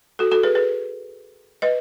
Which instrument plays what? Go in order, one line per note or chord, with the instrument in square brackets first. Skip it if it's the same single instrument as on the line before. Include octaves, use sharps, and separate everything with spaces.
[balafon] F#4 A4
F#4 A4
G#4 B4
G#4 B4
B4 D#5